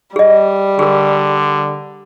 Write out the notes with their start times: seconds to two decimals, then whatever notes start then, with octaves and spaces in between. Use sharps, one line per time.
0.16 G3 G#4 D#5
0.79 D3 G#4 A#4